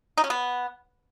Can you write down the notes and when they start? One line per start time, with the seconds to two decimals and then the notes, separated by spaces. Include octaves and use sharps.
0.17 D#4
0.24 C#4
0.30 B3